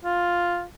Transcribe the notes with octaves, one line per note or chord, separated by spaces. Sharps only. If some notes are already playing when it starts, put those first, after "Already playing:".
F4